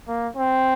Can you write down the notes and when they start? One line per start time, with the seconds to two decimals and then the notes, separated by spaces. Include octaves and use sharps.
0.08 A#3
0.37 C4